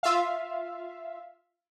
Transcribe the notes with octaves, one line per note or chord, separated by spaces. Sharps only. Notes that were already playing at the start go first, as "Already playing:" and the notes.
F4 E5 F5